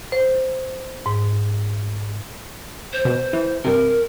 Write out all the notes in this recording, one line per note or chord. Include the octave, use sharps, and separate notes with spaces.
C5
G#2
C5
B2
E3
G2 C3 A#4